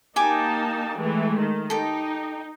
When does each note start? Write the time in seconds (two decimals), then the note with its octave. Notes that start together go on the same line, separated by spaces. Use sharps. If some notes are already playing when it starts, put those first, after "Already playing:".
0.16 A#3 D#4 G4 G#5 A5 D6
0.97 E3 G#3 A3
1.37 D#3
1.70 D#4 G4 A4